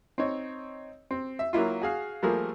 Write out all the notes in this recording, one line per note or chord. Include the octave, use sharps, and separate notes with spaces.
C4 D#4 C#5
C4
E5
F#3 A#3 E4 F4
F#4 G#4 F5
F3 G3 A3 A#3 G#4 A#4